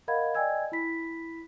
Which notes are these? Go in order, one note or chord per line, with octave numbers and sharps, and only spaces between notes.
A#4 D#5 F5 F#5 B5 G#6
D5 D#5 G5 G#5 E6 G#6
E4 B5 B6